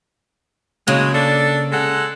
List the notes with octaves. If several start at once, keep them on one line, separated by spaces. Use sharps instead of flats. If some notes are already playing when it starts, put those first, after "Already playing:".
C#3 F#3 G#3 A#3
D4 A4 D5
G#3 A4 F#5